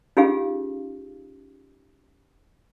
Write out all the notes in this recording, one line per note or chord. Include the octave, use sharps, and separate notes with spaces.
C#4 D#4 F4 G4 G#4 F5